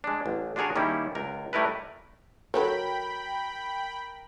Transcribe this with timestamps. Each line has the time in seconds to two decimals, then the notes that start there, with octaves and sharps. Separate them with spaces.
0.04 G#3 D4
0.26 A1
0.56 D4 F4 F#4 G#4 A#4 C#5
0.76 D#3 G3 A#3 C#4 E4
1.15 C#2 A#4
1.53 G3 A3 E4 A#4 B4
2.54 F#3 A4 A#4 C#5 G5 B5